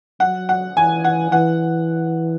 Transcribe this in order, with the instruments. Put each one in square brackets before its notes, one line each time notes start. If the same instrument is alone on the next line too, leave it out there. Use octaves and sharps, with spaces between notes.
[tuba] F#3 [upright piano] F#5
[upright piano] F#5
[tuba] E3 [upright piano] G#5
[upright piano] F#5
[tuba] E3 [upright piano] F#5